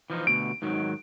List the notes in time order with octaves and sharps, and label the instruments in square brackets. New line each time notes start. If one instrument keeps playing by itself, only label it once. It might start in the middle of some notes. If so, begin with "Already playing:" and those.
[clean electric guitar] E3 F3 D#4
[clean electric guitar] D2 B2 [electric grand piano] D7
[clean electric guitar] G#2 D#3 F#3